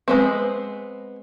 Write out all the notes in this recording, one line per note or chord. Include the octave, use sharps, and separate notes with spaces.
G#3 B3 C4